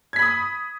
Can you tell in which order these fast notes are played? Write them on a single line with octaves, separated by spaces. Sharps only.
G#6 B6 B5 D#6